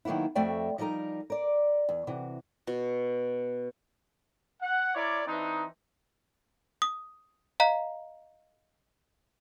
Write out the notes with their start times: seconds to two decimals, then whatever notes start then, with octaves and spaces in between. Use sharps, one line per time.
0.05 D#3 F#3 A#3 B3 E4
0.35 F2 A3 F#4 D5 E5 G5
0.78 F3 G3 D#4 A#4 A#5
1.30 A#4 D5
1.89 E2
2.07 C3 E3 F#4
2.67 B2
4.62 F#5
4.95 E4 A#4 C#5 D5
5.27 E3 C4 D4 D#4
6.82 D#6
7.60 D#5 F5 A#5